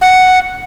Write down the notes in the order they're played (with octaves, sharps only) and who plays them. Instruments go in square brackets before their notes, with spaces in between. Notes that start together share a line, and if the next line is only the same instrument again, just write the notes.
[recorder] F#5